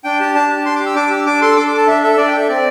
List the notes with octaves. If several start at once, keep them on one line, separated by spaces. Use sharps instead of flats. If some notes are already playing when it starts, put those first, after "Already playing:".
D4 G5
G4 A5
D4 A5
G4
D4 C6
D6
G4
E6
D4 D6
G4 E6
D4 D6
A4 C6
E6
D4 D6
D6
A4
A5
D4 E5
A4 E5
D4 D5
G5
A4 E5
C4 D5